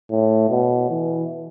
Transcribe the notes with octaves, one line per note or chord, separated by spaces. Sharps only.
A2
B2
E3